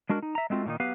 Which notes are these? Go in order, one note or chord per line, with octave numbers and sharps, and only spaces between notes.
G#3 D4 F#4 A#4
D#4
E5 A#5
G#3 A3 C4 F4 F#4
A#2 D#3 D#4
F#3 B3 G4 B4 F5